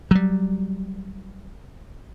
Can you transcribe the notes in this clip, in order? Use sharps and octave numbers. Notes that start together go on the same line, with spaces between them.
F#3 G3